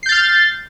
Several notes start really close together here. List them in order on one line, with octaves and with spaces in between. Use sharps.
C7 G6 A6 F6